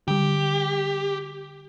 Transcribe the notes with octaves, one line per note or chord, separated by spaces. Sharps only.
D3 G3 G4